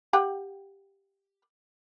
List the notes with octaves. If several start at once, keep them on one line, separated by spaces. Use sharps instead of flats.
G4 F#5 G5